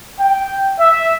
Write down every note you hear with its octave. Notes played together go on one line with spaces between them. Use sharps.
G5
E5